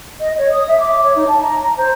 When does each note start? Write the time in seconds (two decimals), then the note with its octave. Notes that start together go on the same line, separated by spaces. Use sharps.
0.20 D#5
0.38 C#5
0.52 D#6
0.68 E5
0.80 D6
1.02 C#5
1.16 D#4
1.27 A5
1.42 A#5
1.59 A#5
1.77 C5